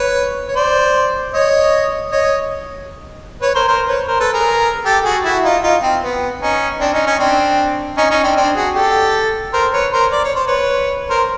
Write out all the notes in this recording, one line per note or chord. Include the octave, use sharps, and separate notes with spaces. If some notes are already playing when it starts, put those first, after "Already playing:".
Already playing: B4 C#5
C#5
C5 D5
C#5 D#5
C#5 D#5
B4 C#5
A#4 C5
A#4 C5
B4 C#5
A#4 C5
A4 B4
G#4 A#4
G4 A4
F#4 G#4
E4 F#4
D#4 F4
D#4 F4
C4
B3
C#4 D#4
C4 D4
C#4 D#4
C#4 D#4
C4 D4
C#4 D#4
C#4 D#4
C4 D4
C4 D4
F#4 G#4
G4 A4
A#4 C5
B4 C#5
A#4 C5
D5
C#5
C5
B4 C#5
A#4 C5